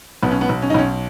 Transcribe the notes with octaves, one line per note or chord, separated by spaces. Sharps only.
B1 B3
C#4
B3
B1
C#4
D#4
B1 C#4